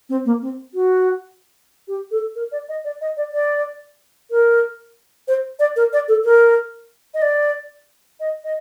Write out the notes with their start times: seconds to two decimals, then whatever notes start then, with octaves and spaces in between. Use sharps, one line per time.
0.09 C4
0.25 A#3
0.42 C4
0.74 F#4
1.88 G4
2.11 A4
2.36 A#4
2.52 D5
2.69 D#5
2.84 D5
3.01 D#5
3.17 D5
3.33 D5
4.31 A#4
5.28 C5
5.59 D5
5.76 A#4
5.93 D5
6.08 A4
6.25 A#4
7.14 D#5
7.22 D5
8.20 D#5
8.44 D#5